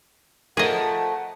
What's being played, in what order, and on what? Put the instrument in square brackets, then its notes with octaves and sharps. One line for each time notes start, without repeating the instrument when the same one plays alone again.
[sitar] F3 A3 A#4 [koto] G#4 D#5 [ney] F#5